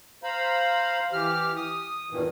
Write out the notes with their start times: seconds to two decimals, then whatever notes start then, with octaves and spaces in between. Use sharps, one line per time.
0.23 C5 F5 A#5 B5
1.13 E3 G4 F6
1.56 D#6
2.11 E2 G2 A#2 D#3 E3